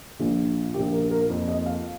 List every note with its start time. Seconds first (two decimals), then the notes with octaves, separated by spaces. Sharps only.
0.19 A#1 A#2 A#3
0.74 A#1 A#2 A#3 G4
0.92 A#4
1.11 A#4
1.30 F2 F3 A#3
1.48 D#5
1.66 F5